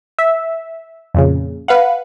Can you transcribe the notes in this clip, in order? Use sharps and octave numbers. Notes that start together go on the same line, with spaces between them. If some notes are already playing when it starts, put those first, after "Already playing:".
E5
F2 A#2 C#3
B4 F5 F#5